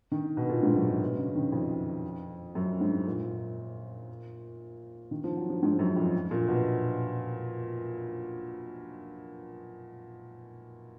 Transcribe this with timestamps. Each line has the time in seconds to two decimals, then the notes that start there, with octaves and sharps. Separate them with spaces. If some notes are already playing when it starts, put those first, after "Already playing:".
0.12 D#3
0.37 B2
0.49 A#2
0.63 G#2
0.76 F#2
0.88 F#2
1.01 B2
1.18 C#3
1.35 D#3
1.52 F2
2.55 F#2
2.81 G#2
3.06 A#2
5.11 D#3
5.24 F3
5.37 F#3
5.50 F3
5.63 G#2
5.79 F#2
5.96 F2
6.31 A#2
6.48 B2